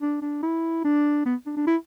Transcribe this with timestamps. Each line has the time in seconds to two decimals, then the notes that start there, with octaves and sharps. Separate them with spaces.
0.02 D4
0.22 D4
0.43 E4
0.84 D4
1.26 B3
1.46 D4
1.56 D4
1.67 E4